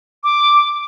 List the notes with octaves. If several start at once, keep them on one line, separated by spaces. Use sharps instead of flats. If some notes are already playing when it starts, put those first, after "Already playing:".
D6